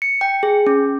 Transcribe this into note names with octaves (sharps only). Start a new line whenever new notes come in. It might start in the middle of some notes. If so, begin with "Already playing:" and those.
C#7
G5
G#4
C#4